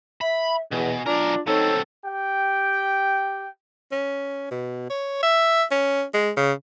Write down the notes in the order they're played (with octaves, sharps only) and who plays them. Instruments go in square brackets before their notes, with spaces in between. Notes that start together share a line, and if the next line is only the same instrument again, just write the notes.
[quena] E5 [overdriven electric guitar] B5
[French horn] E2 [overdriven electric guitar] B2 [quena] G#5
[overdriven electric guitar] B1 A#4 [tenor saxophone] D4 [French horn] F4
[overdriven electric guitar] F#3 C4 [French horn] D#4 [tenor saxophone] A4 [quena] C#5
[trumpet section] G4 G5
[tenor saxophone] C#4
B2
C#5
E5
C#4
G#3
C#3